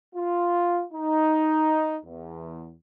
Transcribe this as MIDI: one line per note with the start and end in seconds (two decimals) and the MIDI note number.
0.15 0.83 65
0.93 1.97 63
2.04 2.72 40